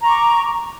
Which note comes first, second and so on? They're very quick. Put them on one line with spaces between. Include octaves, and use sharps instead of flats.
A#5 C#6 D6